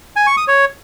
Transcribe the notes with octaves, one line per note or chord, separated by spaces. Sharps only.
G#5
C#6
D#6
C#5